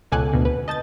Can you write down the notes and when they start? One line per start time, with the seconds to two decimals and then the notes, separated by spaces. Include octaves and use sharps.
0.12 C#2 B2 A4 G#5 D6 F#6
0.33 D2 B2
0.45 B4
0.68 D#5 A5 G6 A6